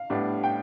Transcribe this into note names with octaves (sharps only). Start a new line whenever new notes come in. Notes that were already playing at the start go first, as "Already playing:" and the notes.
Already playing: F5
A2 G3 B3 D4
G5